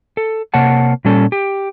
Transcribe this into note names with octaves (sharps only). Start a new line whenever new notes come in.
A4
C3 A#3 C#5 F#5 A5
A#2 G3 C#4 A4
G4